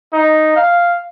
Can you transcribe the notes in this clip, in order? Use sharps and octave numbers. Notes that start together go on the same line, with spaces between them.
D#4
F5